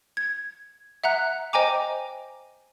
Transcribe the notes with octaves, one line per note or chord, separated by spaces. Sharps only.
G#6
E5 F#5 A#5 F#6
C5 D#5 G5 G#5 A#5 D6